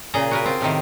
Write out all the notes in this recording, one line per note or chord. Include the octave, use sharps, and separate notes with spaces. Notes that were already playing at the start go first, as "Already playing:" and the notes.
A#2 C#3 G#4 A#5
F#4 A#4 B4
C4 F4
A2 C3 D#3